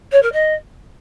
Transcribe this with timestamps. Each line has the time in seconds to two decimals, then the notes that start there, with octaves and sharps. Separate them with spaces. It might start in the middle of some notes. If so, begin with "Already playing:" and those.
0.12 C#5
0.22 A#4
0.33 D#5